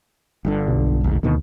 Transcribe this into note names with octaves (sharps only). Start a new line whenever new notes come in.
G1 G2 D3
B1
F1 D2 G#2
D2 B2 D#3 A#3